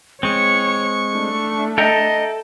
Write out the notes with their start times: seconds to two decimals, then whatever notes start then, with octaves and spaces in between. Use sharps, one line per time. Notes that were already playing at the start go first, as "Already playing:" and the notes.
0.23 G#3 C4 C#5 C#6
1.12 A3 D4
1.78 A4 D#5 E5 G5 A#5